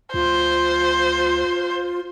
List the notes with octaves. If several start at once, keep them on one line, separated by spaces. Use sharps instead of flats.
D2 F4 C5